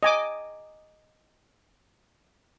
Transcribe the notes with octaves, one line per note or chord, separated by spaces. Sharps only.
D#5 G#5 D6